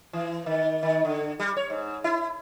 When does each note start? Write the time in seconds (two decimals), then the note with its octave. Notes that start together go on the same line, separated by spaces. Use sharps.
0.13 E3
0.46 D#3
0.83 D#3
1.05 D3
1.40 G3
1.57 C#5
1.70 G#2
2.04 E4